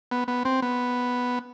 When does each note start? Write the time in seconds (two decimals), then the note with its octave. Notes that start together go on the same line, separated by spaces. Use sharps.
0.11 B3
0.28 B3
0.45 C4
0.62 B3